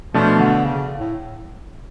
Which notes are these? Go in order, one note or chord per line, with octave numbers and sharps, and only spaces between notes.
B2 F3 A3 D4
D3
C#3
A2